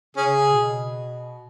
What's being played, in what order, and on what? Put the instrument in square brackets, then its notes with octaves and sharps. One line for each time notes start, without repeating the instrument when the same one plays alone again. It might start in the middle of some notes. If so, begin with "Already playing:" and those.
[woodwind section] C#3 [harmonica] C#4 G#4
[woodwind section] B2